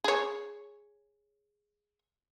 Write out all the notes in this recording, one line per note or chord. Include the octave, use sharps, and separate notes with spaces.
G#4 C#5